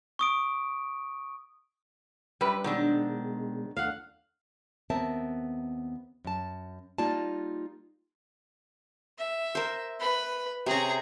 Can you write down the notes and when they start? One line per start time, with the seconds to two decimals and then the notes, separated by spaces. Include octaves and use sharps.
0.19 C#6 D#6 D7
2.41 F#2 G3 B4
2.64 B2 D#3 F#3 G#3 C4 D4
3.77 D#2 A3 D4 F5 F#5
4.90 D#2 B3 C4 A#4 E5 A5
6.25 F#2 A5
6.98 G3 A#3 D#4 F4 D5 A5
9.19 E5
9.55 A#4 C5
9.99 B4 B5
10.66 C3 C#4 G#4 A#5